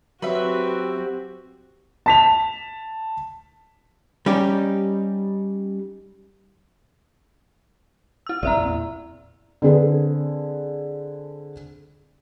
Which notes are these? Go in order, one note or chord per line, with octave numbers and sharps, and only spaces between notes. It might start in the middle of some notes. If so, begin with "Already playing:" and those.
F#3 C4 F#4 G4 B4 E5
A5 B6 F7
G3 C#4 D#4 G4
E4 E6
A#1 G2 C4 D5 E5 A#5
E2 A#2
D3 C4 G#4 A4 B4